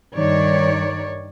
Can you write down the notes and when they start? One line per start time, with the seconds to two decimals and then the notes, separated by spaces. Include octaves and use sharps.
0.16 G2 D#3 C#5 D5